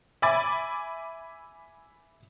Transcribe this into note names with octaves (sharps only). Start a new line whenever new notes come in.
E5 G#5 B5 D6 A6